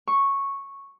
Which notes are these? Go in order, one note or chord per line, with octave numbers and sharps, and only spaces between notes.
C#6